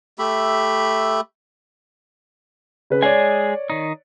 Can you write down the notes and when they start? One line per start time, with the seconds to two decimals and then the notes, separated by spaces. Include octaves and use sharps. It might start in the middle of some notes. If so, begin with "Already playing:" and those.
0.19 A3 G4 E5 B5
2.90 C#3 B4
3.02 G#3 G#4 C#5 D5 G#5
3.70 D#3 D#4